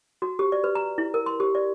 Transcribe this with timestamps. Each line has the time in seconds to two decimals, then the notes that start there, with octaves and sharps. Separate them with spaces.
0.22 F#4
0.39 G4
0.52 D5
0.64 B4
0.75 A#5
0.98 E4
1.14 A#4
1.26 C6
1.40 G4
1.55 D5